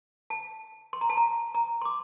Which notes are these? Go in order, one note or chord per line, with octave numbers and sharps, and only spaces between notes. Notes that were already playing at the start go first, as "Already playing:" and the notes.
A5
C6
A#5
A5
A#5
A#5
C6
D6